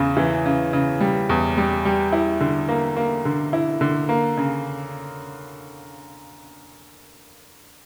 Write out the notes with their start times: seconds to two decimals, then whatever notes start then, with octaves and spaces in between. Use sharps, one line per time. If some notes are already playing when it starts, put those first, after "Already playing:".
Already playing: E2 C#3
0.17 E3
0.46 C#3
0.73 C#3
1.01 G3
1.29 E2
1.57 G3
1.85 G3
2.13 E4
2.40 D3
2.68 A#3
2.96 A#3
3.25 D3
3.53 E4
3.81 D3
4.09 A#3
4.37 C#3